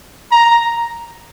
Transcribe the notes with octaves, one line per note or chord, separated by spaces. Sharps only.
A#5